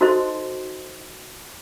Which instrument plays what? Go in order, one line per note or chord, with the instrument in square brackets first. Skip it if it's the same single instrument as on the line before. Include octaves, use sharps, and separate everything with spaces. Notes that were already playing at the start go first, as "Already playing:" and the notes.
[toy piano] D#4 F#4 A4 C5 D#5 C6